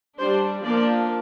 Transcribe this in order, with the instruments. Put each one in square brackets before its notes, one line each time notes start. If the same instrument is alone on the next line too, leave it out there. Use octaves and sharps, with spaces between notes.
[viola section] G3 D4 C5
F3 A#3 D4 D5